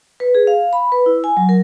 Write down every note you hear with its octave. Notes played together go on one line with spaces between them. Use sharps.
B4
G#4
F5
B5
B4
E4
G#5
F#3
A#4